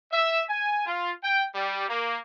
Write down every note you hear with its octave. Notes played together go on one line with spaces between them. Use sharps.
E5
G#5
F4
G5
G3
A#3